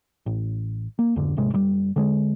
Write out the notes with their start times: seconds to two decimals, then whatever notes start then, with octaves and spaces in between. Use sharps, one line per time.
0.26 A1
0.99 A#3
1.16 B1 F2 G#2 D3
1.37 D#1 G#2 C3 G#3
1.52 F#1 C#3 G3
1.96 D3 G#3